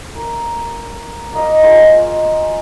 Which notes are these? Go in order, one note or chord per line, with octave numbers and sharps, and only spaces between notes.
A#4
A#3 D#5 F5
G#3 A#3 F4 F#4